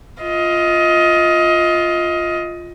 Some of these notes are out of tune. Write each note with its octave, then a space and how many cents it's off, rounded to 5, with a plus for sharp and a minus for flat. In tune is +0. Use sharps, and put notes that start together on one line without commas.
F4 +0 D#5 +20